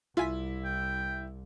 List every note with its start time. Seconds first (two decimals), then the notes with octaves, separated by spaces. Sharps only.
0.17 C2 E4 F4 G#5 B6
0.65 G5